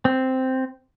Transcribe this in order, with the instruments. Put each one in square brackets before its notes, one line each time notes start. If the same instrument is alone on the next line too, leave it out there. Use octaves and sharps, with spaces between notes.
[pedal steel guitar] C4